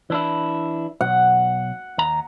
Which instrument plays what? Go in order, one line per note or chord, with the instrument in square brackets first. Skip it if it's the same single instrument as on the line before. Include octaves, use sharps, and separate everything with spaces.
[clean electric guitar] E3 D4 E4
[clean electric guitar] B1 [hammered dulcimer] F#5
[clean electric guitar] D#2 A#5